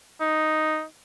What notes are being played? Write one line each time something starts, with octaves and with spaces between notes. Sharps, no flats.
D#4